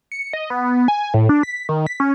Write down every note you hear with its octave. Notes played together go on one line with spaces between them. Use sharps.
C#7
D#5
B3
G#5
A2
D4
B6
D#3
B6
C#4